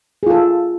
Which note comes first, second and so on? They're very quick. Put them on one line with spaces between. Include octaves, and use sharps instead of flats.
G#4 F4 A4